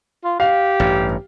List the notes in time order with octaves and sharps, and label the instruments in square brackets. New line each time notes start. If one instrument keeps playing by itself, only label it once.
[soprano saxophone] F4
[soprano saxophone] G4 [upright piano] F5
[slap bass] A1 G2